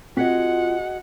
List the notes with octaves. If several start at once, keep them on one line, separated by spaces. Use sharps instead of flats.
C4 F4 F#4 G#4 D#5 F#5 B6